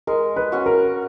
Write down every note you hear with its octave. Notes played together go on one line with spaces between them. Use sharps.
G#3 A#4
B4
C#4 F#4
A#4